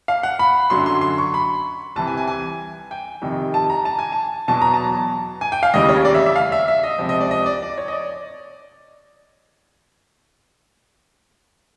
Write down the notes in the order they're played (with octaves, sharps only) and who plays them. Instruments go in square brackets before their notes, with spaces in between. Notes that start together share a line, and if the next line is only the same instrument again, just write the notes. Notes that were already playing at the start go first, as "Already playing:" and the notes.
[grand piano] F5
F#5
B5
F#2 D3 F#3 C6
C6
C6
C#6
B5
C2 C3 E3 A5
G#5
G#5
G#5
G5
F2 C3 D#3 G3
A5
A#5
A5
G#5
A5
E2 B2 F#3 A5
A#5
A5
G#5
G5
F5
F1 D#2 C#3 E3 G3 D#5
C#5
D5
E5
E5
F5
E5
E5
D#5
C#2 C3 F3
D#5
D5
D#5
D5
D5
C#5
D#5
D5